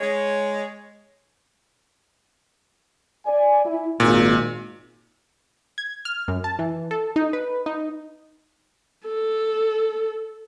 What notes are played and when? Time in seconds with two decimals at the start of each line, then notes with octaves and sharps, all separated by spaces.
0.01 G#3 C#5
3.26 D5 G#5
3.65 E4
4.00 G#1 A#2
5.78 G#6
6.05 F6
6.28 F#2
6.44 A5
6.59 E3
6.91 A4
7.16 D#4
7.33 B4
7.66 D#4
9.07 A4